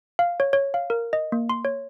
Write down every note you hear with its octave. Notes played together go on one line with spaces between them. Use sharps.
F5
C#5
C#5
F5
A#4
D#5
A#3
C6
C#5